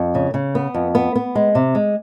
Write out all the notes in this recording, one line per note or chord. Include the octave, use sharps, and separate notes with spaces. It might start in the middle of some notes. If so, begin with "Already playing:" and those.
Already playing: F2
C#3
C#3
B3
F2
B3
B3
G#3
C3
G#3